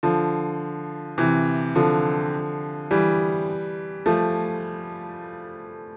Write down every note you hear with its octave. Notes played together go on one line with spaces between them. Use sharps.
D3 F3
C3 E3
D3 F3
E3 G3
F3 A3